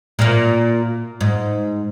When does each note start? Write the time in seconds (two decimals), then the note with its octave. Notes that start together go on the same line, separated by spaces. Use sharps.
0.19 A#2 A#3
1.21 G#2